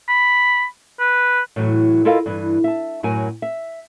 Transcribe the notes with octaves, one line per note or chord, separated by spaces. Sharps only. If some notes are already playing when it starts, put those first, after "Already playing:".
B5
B4
A2 E3 F#3
E4 F4 A4 A#4 D#5 F5
G2 E3
E5 A5
F#2 A2 F#3 A#4 G#5
E5